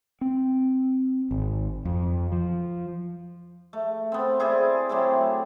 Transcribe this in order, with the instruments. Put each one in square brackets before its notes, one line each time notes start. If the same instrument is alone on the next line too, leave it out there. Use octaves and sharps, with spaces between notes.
[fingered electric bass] C4
G#1
F2
F3
[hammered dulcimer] A3
B3 C4
E4 G#4 C5 D5
F#3 A3 C4 G4